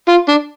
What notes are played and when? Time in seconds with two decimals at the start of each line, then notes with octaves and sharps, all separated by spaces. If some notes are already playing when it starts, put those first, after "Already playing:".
0.08 F4
0.28 D4